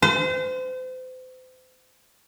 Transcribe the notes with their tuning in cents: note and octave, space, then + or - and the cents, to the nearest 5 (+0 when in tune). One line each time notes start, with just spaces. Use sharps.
C5 -35